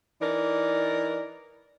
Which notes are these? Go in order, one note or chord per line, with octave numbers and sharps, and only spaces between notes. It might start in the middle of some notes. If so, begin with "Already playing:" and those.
E3 D#4 A#4 D5